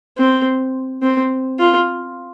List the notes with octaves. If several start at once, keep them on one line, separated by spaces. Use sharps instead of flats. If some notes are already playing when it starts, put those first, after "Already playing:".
C4
C4
F4